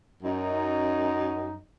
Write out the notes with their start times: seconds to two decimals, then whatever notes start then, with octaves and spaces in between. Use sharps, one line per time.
0.23 F#2 D#4